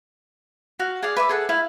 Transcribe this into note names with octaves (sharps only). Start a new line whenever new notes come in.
F#4 F5
G#4 D5 F5
B4 E5 D6
G#4 A4 F#5
E4 F5